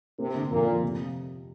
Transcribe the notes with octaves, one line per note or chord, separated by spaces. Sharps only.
C3 A#3
D3
F2 A#2 A#3
F3
C3